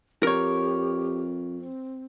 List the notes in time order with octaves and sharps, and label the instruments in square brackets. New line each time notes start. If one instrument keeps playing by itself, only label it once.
[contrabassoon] F2 [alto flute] G4 [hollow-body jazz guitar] A#4 C#5
[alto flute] C4